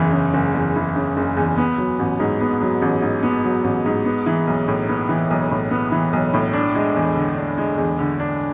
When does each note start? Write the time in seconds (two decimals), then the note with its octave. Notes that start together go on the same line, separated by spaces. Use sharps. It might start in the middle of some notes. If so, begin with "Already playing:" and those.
Already playing: F#1 E2 C#3 E3
0.12 C#3
0.34 F#1
0.54 E2
0.76 E3
0.96 C#3
1.17 F#1
1.37 E2
1.58 B3
1.78 F#3
1.99 A1
2.20 G#2
2.41 B3
2.61 F#3
2.82 A1
3.02 G#2
3.23 B3
3.44 F#3
3.64 A1
3.86 G#2
4.05 B3
4.26 E3
4.47 B1
4.68 A2
4.89 B3
5.09 E3
5.30 B1
5.51 A2
5.71 B3
5.92 E3
6.13 B1
6.34 A2
6.53 D4
6.75 G#3
6.96 E2
7.15 D3
7.37 D4
7.58 G#3
7.78 E2
7.99 D3
8.20 D4